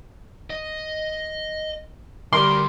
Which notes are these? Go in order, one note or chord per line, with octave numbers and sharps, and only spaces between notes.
D#5
D2 G3 A#4 C6